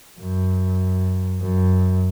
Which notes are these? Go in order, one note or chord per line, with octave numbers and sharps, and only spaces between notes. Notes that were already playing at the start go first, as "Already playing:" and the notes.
F#2
F#2